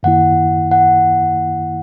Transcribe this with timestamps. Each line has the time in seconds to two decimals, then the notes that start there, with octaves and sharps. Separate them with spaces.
0.03 F#2 D#3 A#3 E4 F#5
0.71 F#5